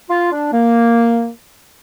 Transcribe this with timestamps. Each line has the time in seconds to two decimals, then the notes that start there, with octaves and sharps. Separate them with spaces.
0.10 F4
0.32 D4
0.53 A#3